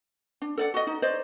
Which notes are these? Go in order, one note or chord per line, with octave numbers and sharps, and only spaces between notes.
D4
A4 D5 F#5
F#4 D#5
D#4
C5 D5 D#5